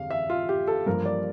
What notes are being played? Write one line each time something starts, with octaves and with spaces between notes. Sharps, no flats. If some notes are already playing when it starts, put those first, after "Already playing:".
Already playing: F2 D3 G3 F5
E5
F4
G4
A4
G2 F3 A#3 A#4
D5